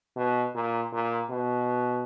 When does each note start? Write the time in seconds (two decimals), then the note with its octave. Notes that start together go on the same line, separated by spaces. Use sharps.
0.16 B2
0.55 A#2
0.93 A#2
1.30 B2